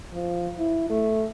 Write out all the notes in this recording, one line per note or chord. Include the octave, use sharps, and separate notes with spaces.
F3
E4
A3